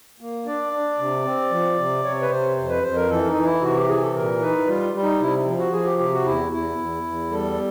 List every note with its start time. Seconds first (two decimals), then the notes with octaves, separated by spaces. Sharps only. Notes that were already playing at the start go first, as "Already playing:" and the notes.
0.20 A#3
0.46 D4 D5
0.73 D4
0.99 C3
1.25 C4
1.51 F3
1.78 C3
2.04 C3 C#5
2.22 B4
2.31 C3 C5
2.57 F2 C5
2.69 B4
2.83 F2 C5
2.96 A#4
3.09 E3 A4
3.27 D#4
3.36 E3
3.45 E4
3.62 C3 F#4
3.75 G4
3.88 E3 G#4
4.02 A4
4.15 A#2 A#4
4.41 D#4 B4
4.67 G3 F4
4.94 G3
5.03 D#4
5.20 C3 E4
5.46 F3
5.59 F#4
5.72 F3 G#4
5.86 G4
5.98 C3 G4
6.13 F#4
6.25 E2 E4
6.52 E2 E4
6.78 E2
7.04 E2
7.30 G3 A4